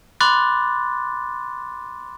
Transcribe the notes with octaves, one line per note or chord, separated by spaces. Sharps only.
B5 C6 D6 F#6 A6